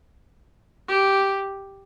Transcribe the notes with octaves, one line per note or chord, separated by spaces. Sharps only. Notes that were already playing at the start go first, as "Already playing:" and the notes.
G4